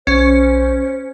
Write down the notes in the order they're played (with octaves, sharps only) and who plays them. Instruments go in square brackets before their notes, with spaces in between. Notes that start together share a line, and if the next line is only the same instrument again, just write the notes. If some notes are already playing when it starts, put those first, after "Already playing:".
[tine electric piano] B1 [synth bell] C#4 [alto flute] C5